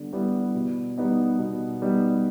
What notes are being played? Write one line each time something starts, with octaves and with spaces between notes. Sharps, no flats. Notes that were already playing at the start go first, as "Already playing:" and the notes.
Already playing: D3 G3 B3
G3 B3 E4
B2
G3 B3 D#4
B2
G3 B3 D#4